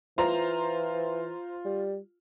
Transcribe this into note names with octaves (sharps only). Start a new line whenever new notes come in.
E3 F4 C5 A#5
G3